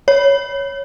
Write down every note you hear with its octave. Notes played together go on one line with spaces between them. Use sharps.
C#5